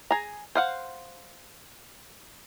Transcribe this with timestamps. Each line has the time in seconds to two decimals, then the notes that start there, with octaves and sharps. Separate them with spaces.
0.11 G#4 A#5
0.55 C5 F5 F#5